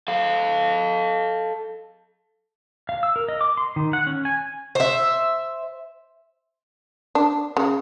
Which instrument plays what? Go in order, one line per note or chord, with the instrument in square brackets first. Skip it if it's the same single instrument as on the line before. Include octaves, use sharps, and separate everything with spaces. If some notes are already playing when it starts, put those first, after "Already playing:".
[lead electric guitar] A4 F5
[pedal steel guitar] F5
E6
A#4
D#5
D6
C6
D#3
F#5
C#4
G#5
[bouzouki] C5 E5
[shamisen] D4
C#3